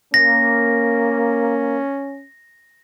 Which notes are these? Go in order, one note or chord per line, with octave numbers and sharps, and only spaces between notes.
A#3 C#4 A#6